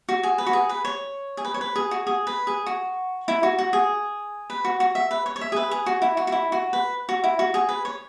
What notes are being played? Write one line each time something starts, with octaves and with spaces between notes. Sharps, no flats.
F#4
G#4
B4
F#4
G#4
B4
C#5
G#4
B4
C#5
B4
G#4
F#4
G#4
B4
G#4
F#4
E4
F#4
F#4
G#4
B4
F#4
F#4
E5
B4
C#5
C#5
E5
G#4
B4
G#4
F#4
E4
F#4
F#4
E4
F#4
B4
F#4
E4
F#4
G#4
B4
C#5